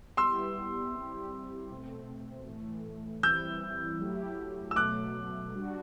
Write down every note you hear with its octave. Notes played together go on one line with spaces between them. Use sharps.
G3 B3 E4 G4 C6 E6
G3 C4 E4 G4
B2 A3 C4
A2 E3 A3
E3 G3 C4 E4 E6 G6
F#3 A3 E4 G4
E6
B2 F#3 A3 D6 F#6
G3 D4 F#4